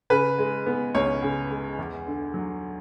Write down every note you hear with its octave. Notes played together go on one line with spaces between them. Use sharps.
C#3 B4
G#3
B3
C#2 C#5
C#3
G#3
E2
D3
F#3